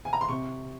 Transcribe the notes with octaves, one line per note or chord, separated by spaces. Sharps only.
G#5
A#5
C6
C3 C#6